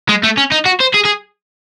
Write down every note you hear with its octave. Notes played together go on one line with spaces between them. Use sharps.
G#3
A3
C#4
D#4
F#4
C5
G#4
G#4